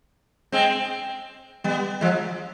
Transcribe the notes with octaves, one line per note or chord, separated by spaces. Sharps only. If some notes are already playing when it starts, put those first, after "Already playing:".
G#3 C4
G3 B3
F3 G#3